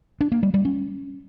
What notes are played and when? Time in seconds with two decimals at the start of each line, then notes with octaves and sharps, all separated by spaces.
0.21 D4
0.32 A#3
0.43 G3
0.54 G3
0.65 C#4